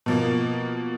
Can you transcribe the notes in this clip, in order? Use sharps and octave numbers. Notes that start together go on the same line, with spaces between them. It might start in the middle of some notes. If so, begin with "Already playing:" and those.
B2 F3 A#3